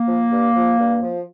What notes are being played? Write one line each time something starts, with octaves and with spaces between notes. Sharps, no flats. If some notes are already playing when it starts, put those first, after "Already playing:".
Already playing: A#3
F3
G2
F3
G2
F3